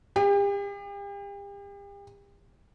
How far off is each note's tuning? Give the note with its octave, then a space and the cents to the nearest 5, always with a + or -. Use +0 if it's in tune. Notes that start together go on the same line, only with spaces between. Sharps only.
G4 +40